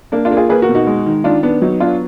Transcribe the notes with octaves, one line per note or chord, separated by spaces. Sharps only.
A#3 D4
D4 F4
A#3
F4 G#4
A#3 G#4 B4
F#4 A#4
B2
D#4 F#4
G#3
D#3
D#3 D4 F4
B3 D4
F#3 D#4
B3 D4 F4